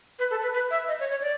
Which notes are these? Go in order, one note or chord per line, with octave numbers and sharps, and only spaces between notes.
B4
A4
B4
B4
E5
D#5
C#5
C#5
D5